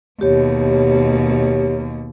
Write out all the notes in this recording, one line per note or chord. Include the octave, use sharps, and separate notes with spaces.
D#2 B2 G4 C#5